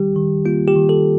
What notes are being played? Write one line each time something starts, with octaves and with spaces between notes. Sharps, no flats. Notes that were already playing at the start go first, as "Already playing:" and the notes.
Already playing: D#3 G3 G4
D#3
A#3 F4
G4
D#3
A4